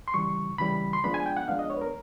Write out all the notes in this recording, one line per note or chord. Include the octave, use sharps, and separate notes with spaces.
C6
C#3 E3 G3 C#6
C#3 E3 G3 B5
C6
F3 G#3 B3 D4 B5
G#5
G5
F#5
F3 G#3 B3 D4 F5
D#5
C#5
B4
A#4